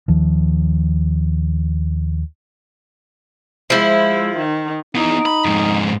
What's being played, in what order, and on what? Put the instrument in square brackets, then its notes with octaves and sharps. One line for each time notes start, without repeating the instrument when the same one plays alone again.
[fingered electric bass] D#2 D#3 F3
[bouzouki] F3 E4 [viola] G#3 C5
[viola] D#3
[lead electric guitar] B3 E4 [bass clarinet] D#4
[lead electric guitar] B5
F2 G#2